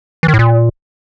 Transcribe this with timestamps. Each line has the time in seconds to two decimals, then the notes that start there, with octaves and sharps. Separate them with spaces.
0.23 E3
0.28 D#3
0.34 A2
0.39 A#2